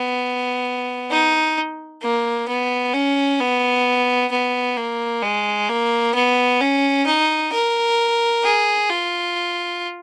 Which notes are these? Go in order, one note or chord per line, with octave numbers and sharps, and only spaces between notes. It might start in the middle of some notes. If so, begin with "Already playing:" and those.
Already playing: B3
D#4
A#3
B3
C#4
B3
B3
A#3
G#3
A#3
B3
C#4
D#4
A#4
G#4
F4